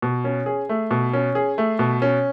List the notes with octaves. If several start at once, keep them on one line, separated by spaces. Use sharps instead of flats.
B2
C#4
G#4
A3
B2
C#4
G#4
A3
B2
C#4